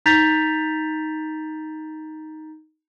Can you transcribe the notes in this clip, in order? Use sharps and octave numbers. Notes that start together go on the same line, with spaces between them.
D#4 A#5 G6 A6 B6 F7